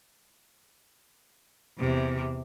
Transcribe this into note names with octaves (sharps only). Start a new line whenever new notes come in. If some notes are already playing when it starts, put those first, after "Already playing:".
E2 C3